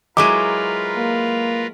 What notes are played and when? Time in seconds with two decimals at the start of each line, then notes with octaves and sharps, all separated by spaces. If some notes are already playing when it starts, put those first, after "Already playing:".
0.17 F#3 G#3 E4 F4 A#4 B4 D6 D#7
0.97 A#3